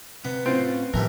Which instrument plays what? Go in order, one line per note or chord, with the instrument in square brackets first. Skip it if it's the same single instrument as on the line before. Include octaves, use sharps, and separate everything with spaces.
[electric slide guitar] C3 [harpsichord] B3
[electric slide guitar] A2 C#4 F4 [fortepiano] C4
[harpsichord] A#1 E3 G3 [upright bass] A2 D#3 [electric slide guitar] A#4